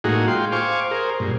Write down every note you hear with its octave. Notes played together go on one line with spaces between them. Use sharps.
A2 G#3 A#3 D#4 F#4 G#4
F4 G5 C6
C5 F5 G#5 C#6 D6
G#4 A#4 C5
G2 A#2